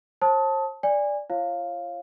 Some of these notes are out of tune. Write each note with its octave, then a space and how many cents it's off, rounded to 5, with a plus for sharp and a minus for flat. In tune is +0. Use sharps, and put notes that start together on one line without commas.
C5 +40 A5 +0 D#6 +30
D5 +0 G#5 -25
F4 -40 C#5 -30 F5 +0